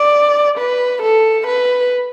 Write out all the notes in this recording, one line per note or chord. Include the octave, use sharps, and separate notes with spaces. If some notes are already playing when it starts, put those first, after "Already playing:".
Already playing: D5
B4
A4
B4